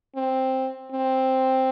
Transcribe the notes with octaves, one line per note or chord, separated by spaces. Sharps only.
C4
C4